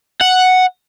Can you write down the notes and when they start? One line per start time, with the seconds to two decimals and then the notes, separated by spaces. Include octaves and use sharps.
0.21 F#5